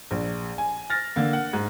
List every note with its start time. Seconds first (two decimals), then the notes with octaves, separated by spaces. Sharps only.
0.11 A#1
0.58 G#5
0.90 F6 A6 A#6
1.16 D3 A#3
1.33 F#5
1.53 G#2